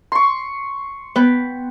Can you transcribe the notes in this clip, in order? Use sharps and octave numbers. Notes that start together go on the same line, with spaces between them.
C6 C#6
B3 B4 G5